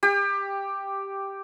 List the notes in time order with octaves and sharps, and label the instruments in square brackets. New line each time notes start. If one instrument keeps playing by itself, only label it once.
[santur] G4